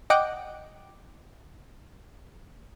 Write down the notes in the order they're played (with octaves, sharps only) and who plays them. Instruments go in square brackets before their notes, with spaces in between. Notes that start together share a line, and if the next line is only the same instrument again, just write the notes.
[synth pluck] D#5 F#5 G5 D6